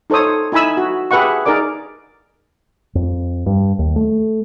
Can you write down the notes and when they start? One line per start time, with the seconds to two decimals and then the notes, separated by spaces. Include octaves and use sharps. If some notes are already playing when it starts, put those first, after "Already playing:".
0.10 D#4 A4 C5 C#5 D#6
0.52 D#4 E4 G#5 B5 E6
0.77 F#4
1.11 G4 G#4 B4 E5 F#5 C#6
1.46 D#4 G#4 A#4 D5 D6
2.95 F2
3.46 G2
3.79 D#2
3.96 A3